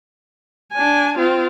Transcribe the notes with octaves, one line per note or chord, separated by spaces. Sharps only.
D4 G#5
C4 F4